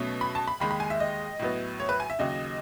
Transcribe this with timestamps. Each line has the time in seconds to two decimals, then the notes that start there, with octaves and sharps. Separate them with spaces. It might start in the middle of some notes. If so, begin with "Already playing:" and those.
Already playing: B2 F#3 A3 C#4
0.21 B5
0.35 A5
0.48 B5
0.60 D#2 D#3 G#3 B5
0.71 B5
0.80 G#5
0.90 E5
1.00 D#5
1.39 A2 F#3 B3
1.80 C#5
1.89 B4
2.00 G#5
2.10 E5
2.19 D#2 C#3 F#3 D#5